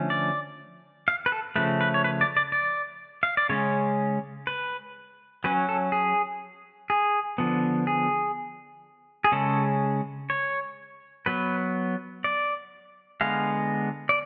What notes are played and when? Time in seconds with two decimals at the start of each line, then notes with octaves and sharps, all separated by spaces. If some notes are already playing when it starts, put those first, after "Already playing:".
Already playing: D3 F3 A3 C#4
0.10 D5
1.08 F5
1.26 B4
1.32 A4
1.56 C#3 F3 A3 B4
1.81 B4
1.94 C#5
2.04 B4
2.21 D5
2.37 D5
2.52 D5
3.23 F5
3.37 D5
3.49 C#3 G#3 C#4 C#5
4.47 B4
5.44 F#3 C#4 B4
5.69 A4
5.92 G#4
6.90 G#4
7.38 D3 F3 B3
7.87 G#4
9.24 G#4
9.32 C#3 G#3 C#4 A4
10.30 C#5
11.26 F#3 B3 B4
12.24 D5
13.21 D3 G#3 B3 F5
14.09 D5